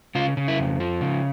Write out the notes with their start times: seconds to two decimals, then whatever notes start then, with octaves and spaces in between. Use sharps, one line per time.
0.15 C#3 F4
0.37 C#3
0.48 E4
0.59 F2
0.80 F3
1.01 C#3